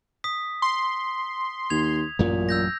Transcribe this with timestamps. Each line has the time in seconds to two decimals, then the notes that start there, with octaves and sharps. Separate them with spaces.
0.24 D#6 B6
0.62 C6
1.70 D#2 G#6 F7
2.19 A1 F#2 A#2 F#3
2.49 E6 G6 A#6